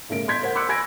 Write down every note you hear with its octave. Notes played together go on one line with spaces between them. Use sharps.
G1 A2 C#3 A#4 D7
C6 G6 G#6 B6
A#4 C5 F#5
C6 D6 E6 F#6 C#7
G#5 B5 E6 G#6 A#6 D7